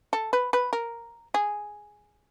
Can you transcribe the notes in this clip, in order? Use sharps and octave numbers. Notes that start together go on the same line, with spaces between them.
A4
B4
B4
A#4
G#4